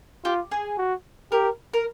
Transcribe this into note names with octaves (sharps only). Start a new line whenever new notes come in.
F4 G4
G#4
F#4
G4 A#4
A#4